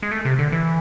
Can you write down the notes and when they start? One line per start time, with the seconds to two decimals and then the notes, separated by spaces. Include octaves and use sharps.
0.03 G#3
0.12 A3
0.25 C3
0.39 D3
0.52 E3